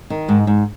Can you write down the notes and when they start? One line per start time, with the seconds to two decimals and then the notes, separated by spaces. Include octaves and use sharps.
0.10 D#3
0.28 G#2 G#3
0.47 G#2